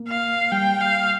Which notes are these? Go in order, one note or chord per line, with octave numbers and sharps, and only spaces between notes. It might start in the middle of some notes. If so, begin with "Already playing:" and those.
Already playing: A#3
F5
G3 G5
F5